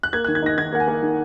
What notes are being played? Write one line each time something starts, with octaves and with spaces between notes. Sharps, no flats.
F#6
A#3 G#6
D#3 F#6
G#6
D#4 A#6
D#3 G#6
A#3 F#5
G#5
A#3
D#3